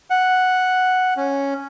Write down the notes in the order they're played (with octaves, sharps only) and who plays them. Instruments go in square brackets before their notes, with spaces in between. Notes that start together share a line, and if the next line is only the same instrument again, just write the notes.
[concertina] F#5
C#4